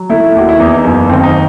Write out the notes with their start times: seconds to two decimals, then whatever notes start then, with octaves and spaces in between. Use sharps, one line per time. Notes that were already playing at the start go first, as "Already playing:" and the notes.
Already playing: F#3
0.10 A3 E4
0.35 D#2 F#4
0.49 E4
0.60 E2 D#4
0.84 F#1
1.09 D#3 C4
1.23 D#4